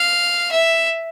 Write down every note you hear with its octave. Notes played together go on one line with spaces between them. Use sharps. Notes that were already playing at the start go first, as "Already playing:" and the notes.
Already playing: F5
E5